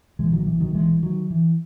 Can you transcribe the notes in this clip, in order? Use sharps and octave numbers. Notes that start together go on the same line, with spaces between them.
B1 A#2 E3 G#3
D#3 F#3
E3
D#3 F#3
E3 G#3
D#3 F#3
E3